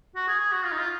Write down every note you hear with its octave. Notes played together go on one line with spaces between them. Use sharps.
F#4
G#4
G#4
F#4
F4
D#4
F4